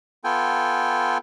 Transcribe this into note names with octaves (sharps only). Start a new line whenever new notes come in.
B3 F4 A4 G5 G#5